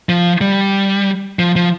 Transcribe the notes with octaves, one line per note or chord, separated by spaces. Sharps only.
F3
G3
F3
F3